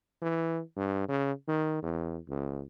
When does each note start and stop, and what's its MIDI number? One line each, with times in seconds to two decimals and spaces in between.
0.22 0.61 52
0.77 1.08 43
1.08 1.32 49
1.48 1.78 51
1.83 2.17 40
2.29 2.63 37